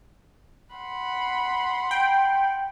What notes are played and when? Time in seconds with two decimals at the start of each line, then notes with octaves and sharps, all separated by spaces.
0.74 F#5 B5 C6
1.91 G5